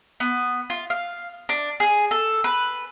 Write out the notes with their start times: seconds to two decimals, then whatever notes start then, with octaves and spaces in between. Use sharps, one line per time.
0.20 B3
0.70 F4
0.90 F5
1.49 D4
1.80 G#4
2.11 A4
2.44 B4